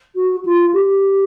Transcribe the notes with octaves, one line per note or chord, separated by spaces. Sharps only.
F#4
F4
G4